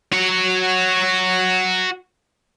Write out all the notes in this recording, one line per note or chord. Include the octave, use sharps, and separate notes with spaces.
F#4 C#5